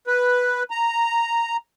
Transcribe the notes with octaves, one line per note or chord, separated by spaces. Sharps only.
B4
A#5